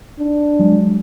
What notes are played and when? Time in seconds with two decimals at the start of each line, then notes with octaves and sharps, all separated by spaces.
0.19 D4
0.59 F#3 G#3